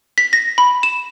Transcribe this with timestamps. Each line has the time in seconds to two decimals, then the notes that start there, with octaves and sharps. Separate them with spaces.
0.18 B6
0.33 A#6
0.58 B5
0.83 E7